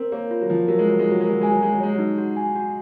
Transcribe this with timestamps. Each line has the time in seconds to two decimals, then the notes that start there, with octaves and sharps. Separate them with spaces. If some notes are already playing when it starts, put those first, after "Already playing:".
Already playing: C4 A#4
0.12 A#3 C#5
0.31 F4
0.41 F#3
0.50 F3 F4
0.68 F#3 A#4
0.79 G#3
0.87 F#3 F4
0.99 G#3
1.06 F#3 F4
1.21 G#3 A#4
1.31 F#3
1.41 G#3 G#5
1.52 F#3
1.62 G#3 F#4
1.73 F#3
1.80 G#3 C#5
1.93 F#3
1.99 D#4
2.18 F#4
2.36 G#5
2.56 F#4